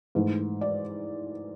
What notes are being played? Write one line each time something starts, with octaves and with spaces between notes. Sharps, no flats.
G#2 E3 A3
D5